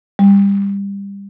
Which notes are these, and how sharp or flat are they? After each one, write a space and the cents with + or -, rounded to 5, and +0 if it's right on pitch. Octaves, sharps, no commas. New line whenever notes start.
G3 +20